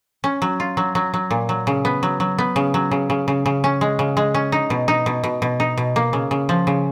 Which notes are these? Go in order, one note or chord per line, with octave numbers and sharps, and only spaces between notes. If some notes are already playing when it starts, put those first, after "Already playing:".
C#4
F#3
F4
F#3
F#3
F#3
A#2
F#3
C#3
B3
F#3
F#3
B3
C#3
F#3
C#3
C#3
C#3
C#3
C#4
G#3
C#3
G#3
C#4
D#4
B2
D#4
B2
B2
B2
D#4
B2
A#3
C#3
C#3
F3
C#3